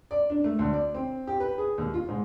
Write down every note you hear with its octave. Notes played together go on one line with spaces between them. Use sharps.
D5
D4
A3
D2
D5
C4
G4
B4
G#4
D#2
F4
G#2